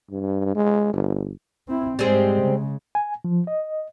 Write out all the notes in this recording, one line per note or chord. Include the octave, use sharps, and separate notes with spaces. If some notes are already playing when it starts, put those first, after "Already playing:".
G2
G#3
G1
C4 E4
G#2 G3 G#3 C4 G#4
C#3
G#5
F3
D#5